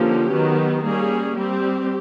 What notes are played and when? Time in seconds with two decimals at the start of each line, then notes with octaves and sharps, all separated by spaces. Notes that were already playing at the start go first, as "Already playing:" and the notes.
Already playing: D3 F3 A#3 C#4 G4
0.31 D#3 F#3 B3
0.84 G3 A#3 C#4 G#4
1.37 G3 C4 G4